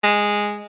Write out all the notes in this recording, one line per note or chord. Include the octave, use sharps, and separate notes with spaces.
G#3